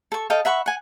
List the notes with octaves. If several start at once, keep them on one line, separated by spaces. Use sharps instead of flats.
A4 C#6
A4 D#5 F5 G5
E5 F#5 B5 C#6
F#5 G#5